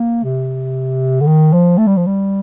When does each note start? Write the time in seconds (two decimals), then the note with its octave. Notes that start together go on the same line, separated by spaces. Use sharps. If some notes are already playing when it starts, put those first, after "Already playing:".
Already playing: A#3
0.24 C3
1.21 D3
1.26 D#3
1.53 F3
1.78 A3
1.87 G3
1.97 F3
2.07 G3